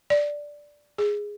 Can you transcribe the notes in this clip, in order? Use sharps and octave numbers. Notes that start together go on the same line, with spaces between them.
D5
G#4